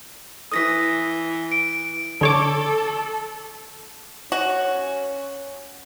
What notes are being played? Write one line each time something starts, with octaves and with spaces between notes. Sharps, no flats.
E3 D#6 A#6 B6
D7
D3 A4 C#5 D6
C#4 F#4